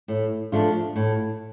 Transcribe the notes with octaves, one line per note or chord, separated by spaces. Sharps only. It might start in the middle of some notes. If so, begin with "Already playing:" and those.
A2
F3 A3 D4 F4
A2